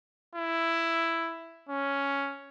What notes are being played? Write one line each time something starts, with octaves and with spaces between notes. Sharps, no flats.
E4
C#4